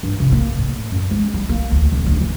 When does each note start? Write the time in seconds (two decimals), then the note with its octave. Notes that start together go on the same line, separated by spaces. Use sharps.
0.03 G2
0.20 C3
0.32 A#3
0.58 A2
0.92 F#2
1.11 G#3
1.34 G3
1.49 A#3
1.71 D2
1.92 D#1
2.06 D2
2.21 E3